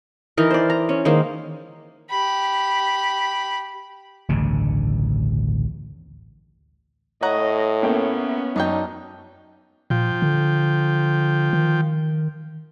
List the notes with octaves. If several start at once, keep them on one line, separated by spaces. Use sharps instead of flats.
E3 D#4 A#4
C5 D5
A#5
C#4
D#3 G#3 A#3 C5
G4 B5
A1 D2 G2 C#3
A2 C#5 D#5 F#5 A#5
A#3 B3 C#4 E5 G5
F#2 D4 D#4 C#5 G5
A#2 F3 G5
D3
D#3